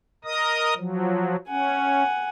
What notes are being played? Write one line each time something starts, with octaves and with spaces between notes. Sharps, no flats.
A#4 D#5 D#6
F3 F#3
C#4 F#5 G#5